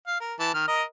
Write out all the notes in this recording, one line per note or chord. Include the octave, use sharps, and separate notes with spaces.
F5
A#4
E3 A5
D#3 F6
A#4 D#5